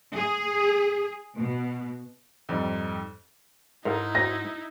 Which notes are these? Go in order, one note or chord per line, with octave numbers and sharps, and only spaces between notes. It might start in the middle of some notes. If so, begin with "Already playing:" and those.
G#4
B2
F2 G#2 G3
G#2 D#4 E4 A4 A#4
F#4 C5 A#5 A#6